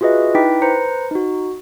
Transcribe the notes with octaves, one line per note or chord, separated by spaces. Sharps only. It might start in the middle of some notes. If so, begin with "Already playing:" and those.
F4 F#4 G#4 B4 D#5 E5
D#4 E4 B4 G5 D6 B6
B4 C5 A#5 C#7
D#4 F#4